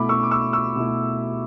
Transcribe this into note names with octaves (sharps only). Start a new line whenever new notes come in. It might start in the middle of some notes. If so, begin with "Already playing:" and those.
Already playing: B2 A3 E4 B5 D6
C#6 E6
D6
C#6 E6
C#6 E6
B2 A3 E4